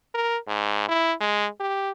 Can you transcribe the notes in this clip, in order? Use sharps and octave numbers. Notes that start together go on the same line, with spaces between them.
A#4
G#2
E4
G#3
G4